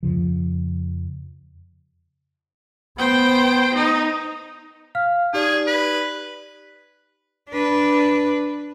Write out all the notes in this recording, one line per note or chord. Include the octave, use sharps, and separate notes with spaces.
F2 C#3 F3
B3 C5 G5
D#4
F5 F6
D#4 G4 G#4 D5
B4
D4 B4